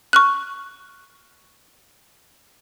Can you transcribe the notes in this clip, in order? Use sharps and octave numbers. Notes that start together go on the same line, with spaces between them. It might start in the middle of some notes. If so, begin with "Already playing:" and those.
C#6 F6 F#6